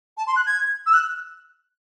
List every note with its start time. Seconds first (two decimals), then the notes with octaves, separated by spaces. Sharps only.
0.17 A5
0.27 C6
0.36 F#6
0.46 G#6
0.86 E6
0.94 F#6